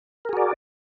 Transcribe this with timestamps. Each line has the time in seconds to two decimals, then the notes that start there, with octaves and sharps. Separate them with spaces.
0.25 A#4
0.29 G#4
0.33 F#4
0.37 D5